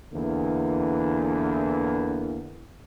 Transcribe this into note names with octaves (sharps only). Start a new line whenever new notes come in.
E2 D3 E3 A#3